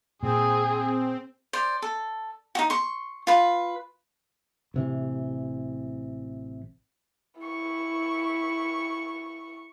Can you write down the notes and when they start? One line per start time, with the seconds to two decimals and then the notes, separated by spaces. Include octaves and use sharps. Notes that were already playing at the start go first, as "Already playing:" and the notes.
0.23 A#2 C4 G#4
1.53 C5 D5
1.82 A4
2.55 D#4 F#4
2.70 C6 C#6
3.27 F4 B4
4.74 A1 C3 E3
7.41 E4 C#6